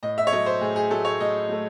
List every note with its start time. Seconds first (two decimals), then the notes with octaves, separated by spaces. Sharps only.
0.03 A2 D#5
0.18 E5
0.27 C#5
0.32 F#3 A3 D#5
0.46 C5
0.61 A2 G#4
0.76 G#4
0.90 F#3 A3 A4
1.05 C#5
1.20 A2 D#5
1.49 F#3 A3